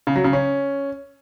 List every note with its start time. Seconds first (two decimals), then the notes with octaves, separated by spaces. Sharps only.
0.07 C#3
0.16 F#3
0.24 C#3
0.33 C#4